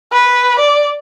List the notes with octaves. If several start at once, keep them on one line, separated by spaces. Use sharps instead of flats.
B4
D5